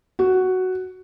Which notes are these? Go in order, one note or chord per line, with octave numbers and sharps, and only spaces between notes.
F#4